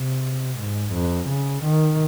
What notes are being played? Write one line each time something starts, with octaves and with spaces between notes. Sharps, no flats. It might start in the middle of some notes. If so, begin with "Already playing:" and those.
Already playing: C3
G#2
F2
C#3
D#3